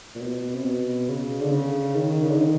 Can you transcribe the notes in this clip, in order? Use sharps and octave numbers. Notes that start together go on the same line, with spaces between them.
A#2
B2
C3
B2
C#3
D3
C#3
D#3
C#3
D3
D#3